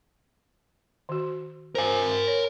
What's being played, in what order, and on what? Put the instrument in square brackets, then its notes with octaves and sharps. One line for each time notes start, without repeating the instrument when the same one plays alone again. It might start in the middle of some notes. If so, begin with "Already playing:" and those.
[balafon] D#3 F#4
[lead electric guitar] A#4 G#5 [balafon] C5 F5
[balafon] C#5